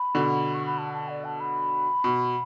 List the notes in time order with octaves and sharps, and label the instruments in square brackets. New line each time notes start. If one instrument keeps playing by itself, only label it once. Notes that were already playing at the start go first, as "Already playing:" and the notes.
Already playing: [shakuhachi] B5
[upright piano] B2 D3
[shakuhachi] C#6
B5
A5
A5
D5
A5
B5
[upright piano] B2